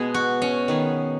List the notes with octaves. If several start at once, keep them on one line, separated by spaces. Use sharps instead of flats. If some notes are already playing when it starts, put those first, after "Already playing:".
Already playing: B2 G#3 B3 G#4
F#4
C#4
D#3 B3 G#4